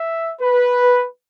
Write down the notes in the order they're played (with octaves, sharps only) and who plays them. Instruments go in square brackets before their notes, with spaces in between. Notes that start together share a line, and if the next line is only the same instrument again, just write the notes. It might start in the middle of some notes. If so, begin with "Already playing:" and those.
Already playing: [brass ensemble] E5
B4